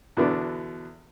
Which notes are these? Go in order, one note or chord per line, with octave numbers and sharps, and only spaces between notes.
E2 B2 D3 B3 D4